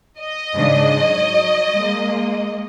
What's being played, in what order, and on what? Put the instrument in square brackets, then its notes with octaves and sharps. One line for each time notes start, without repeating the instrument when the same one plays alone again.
[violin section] D#5
[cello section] G#2 C#3 D4
F#3 C#5
G#3 A#3